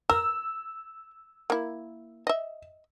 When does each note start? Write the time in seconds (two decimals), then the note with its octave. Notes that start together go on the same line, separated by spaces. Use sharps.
0.10 A#4 E6
1.50 A#3 E4
2.27 D#5 E5